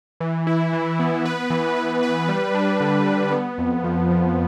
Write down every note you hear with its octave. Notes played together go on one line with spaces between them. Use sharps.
E3
E4
E3
B3
B4
E3
B4
B4
G3
D4
D3
G3
B3
F2
F3
F3